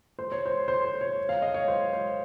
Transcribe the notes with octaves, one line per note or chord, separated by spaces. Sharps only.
C5
C#5
C5
C5
C5
C#5
F5
D#5
C#5
C5
C5